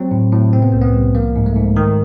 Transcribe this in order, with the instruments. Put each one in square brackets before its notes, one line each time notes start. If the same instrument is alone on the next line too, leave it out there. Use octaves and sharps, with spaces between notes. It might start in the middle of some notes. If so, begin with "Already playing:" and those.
Already playing: [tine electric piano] F#3 C4
A2
A2
C3 C4
B3
C2 A#3
B3
C2
F3 A#3
G#2
A3
G#2
D#3